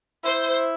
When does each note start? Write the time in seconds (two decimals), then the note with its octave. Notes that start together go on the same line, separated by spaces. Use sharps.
0.24 E4 C5